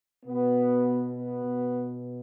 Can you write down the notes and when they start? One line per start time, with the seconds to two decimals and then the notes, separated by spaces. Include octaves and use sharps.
0.24 B2 B3
1.14 B3
1.44 B2